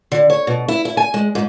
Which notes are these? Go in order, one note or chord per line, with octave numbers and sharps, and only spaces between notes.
D3
C#5
B2
E4
E4
G#5
G#3
G#2